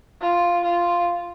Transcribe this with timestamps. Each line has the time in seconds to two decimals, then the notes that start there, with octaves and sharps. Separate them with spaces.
0.21 F4
0.64 F4